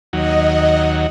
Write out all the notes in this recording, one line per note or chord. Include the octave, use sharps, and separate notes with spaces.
D#2 F#3 D#5